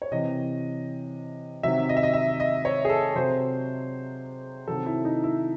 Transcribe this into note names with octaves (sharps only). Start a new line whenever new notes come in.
C#5
C3 E3 D#5
C3 D#3 F#3 E5
D#5
E5
D#5
E5
D#5
C#5
G#4
A4
C3 F#3 C5
C3 D#3 F#3 A4
E4
D#4
E4